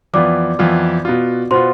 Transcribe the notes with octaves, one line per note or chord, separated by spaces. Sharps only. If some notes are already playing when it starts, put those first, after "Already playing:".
F2 E3 B3 F4 D5 D6
F2 E3 B3 F4
B2 B3 F4
B2 B3 F4 C5 C6